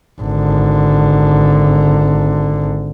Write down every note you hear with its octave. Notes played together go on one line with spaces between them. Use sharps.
G#1 D3